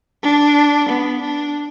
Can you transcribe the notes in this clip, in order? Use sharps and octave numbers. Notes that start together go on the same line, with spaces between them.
D4
B3
D4